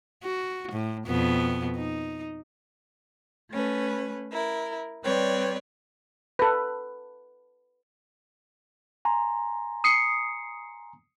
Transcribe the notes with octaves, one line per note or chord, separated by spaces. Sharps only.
F#4
A2
F2 B2 B3
D#4
A3 C#4 B4
E4 A#4
G3 C4 B4 C#5 D5
A4 B4
G#5 A#5 C6
D#6 C7 C#7